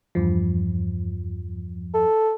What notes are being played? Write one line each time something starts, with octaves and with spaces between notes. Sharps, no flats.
E2 G2 F3
A4